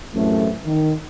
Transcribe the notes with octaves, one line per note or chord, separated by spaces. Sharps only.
F#2 A2 C3 E3 A3
D#3